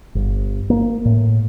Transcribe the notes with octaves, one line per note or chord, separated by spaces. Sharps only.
G1
A#3
A2